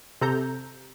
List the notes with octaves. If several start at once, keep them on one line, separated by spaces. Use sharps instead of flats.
C3 A4 A#5 G6